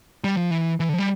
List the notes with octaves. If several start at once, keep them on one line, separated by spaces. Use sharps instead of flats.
G3
F3
E3
E3
D3
F3
G3